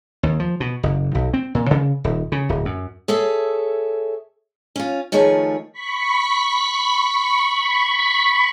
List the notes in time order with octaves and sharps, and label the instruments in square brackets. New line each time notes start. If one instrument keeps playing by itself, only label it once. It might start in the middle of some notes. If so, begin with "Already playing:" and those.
[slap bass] D#2
F3
B2
F#1
B1
C4
A#2
C#3
D#1
C#3
D1
F#2
[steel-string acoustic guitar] G#4 A4 C#5 E5
C#4 F4
D#3 F3 A3 G#4 C#5
[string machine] B5 C#6 B6